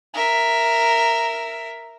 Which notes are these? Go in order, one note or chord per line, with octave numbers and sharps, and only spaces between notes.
A#4 E5